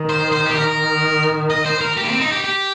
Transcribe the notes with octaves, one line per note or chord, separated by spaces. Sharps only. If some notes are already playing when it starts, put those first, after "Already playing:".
Already playing: D#3
C5
C5
G4
D#3 A#4
D#5
C5
A#4
G4
A#3
C4
D#4
G4
G4